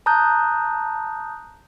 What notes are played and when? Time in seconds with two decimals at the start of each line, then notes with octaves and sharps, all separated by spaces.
0.06 A5 A#5 D#6 F#6 G6